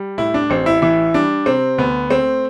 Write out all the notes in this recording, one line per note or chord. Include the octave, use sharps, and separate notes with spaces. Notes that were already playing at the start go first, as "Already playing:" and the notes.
Already playing: G3
A2 E4
D4
A1 C4
E4
E3 E4
G3 D4
C3 C4
D2 B3
A3 C4